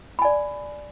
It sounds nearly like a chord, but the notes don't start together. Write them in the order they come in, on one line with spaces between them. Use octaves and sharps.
B5 G#5 D5